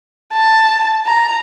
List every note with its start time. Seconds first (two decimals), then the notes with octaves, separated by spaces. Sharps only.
0.33 A5
1.06 A#5